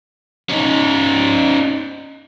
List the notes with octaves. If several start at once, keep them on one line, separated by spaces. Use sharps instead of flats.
C#4 D#4